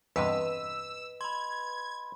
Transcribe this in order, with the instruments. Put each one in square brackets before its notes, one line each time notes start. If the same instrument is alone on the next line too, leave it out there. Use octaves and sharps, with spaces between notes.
[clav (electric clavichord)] E2 G2 C3 [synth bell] B4 D#5 [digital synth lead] E6
[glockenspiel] B5 C6 [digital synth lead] G#6